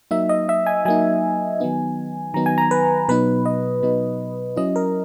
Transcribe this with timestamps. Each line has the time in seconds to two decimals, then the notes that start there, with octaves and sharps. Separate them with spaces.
0.11 F#3 A#3 D#4 E5
0.29 D#5
0.49 E5
0.66 G#5
0.85 F#3 A#3 D#4 G#5
1.60 D#3 F#3 B3 D#4
2.34 D#3 F#3 B3 D#4 A#5
2.46 G#5
2.58 A#5
2.71 B4
3.08 B2 F#3 B3 D#4 B4
3.46 D#5
3.83 B2 F#3 B3 D#4
4.56 F#3 C#4 E4 D#5
4.76 A#4